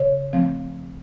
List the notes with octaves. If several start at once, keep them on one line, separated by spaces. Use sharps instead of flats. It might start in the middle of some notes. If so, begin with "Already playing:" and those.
Already playing: C#3 C#5
F3 A3 C4